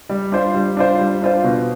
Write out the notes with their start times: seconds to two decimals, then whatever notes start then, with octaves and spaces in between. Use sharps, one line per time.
0.09 G3
0.32 D4 F4 C5
0.54 G3
0.77 D4 F4 C5
0.99 G3
1.22 D4 F4 C5
1.44 B2